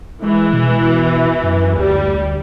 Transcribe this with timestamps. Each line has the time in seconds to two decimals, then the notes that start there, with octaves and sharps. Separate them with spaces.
0.22 E3 G#3
0.53 B2
1.44 F#2
1.76 D2 G3